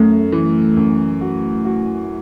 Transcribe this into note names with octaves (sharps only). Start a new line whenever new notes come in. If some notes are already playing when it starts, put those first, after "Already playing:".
Already playing: F#2 A3
E3
F#2
F#4
F#4